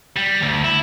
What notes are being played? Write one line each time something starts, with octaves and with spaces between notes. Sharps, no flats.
G3
D2
E4